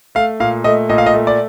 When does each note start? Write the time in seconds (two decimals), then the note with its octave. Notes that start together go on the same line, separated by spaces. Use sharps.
0.15 A3 F5
0.40 A#2 F5
0.64 A3 D#5
0.89 A#2 D#5
0.98 F5
1.06 D#5
1.14 A3
1.27 D5